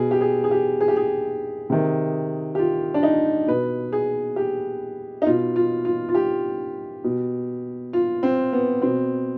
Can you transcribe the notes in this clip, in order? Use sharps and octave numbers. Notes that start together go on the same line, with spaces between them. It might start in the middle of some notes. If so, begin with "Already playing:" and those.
Already playing: B2 G#4
G4
G#4
G#4
G4
G#4
G4
G#4
C3 D#3
G4
F4
D4
D#4
B2 B4
G#4
G4
D#4
B2 F4
F4
F4
F4
G4
B2
F4
C4
B3
B2 C4